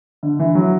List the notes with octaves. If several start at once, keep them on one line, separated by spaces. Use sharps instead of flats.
D3
E3
F#3